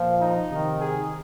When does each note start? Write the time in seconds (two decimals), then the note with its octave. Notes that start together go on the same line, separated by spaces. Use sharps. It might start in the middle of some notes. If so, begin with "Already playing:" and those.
Already playing: A#2 F3
0.19 D#4
0.49 C3 D#3
0.81 G#4